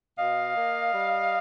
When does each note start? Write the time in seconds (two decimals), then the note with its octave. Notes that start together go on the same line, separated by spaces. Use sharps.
0.18 B2 D#5 F5
0.56 A#3
0.93 G3